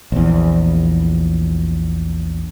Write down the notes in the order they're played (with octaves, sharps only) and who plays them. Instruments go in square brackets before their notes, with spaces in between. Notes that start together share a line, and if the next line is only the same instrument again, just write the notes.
[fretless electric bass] A#1 E2